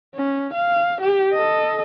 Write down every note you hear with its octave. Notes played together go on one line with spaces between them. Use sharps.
C#4
F5
G4
A4 D#5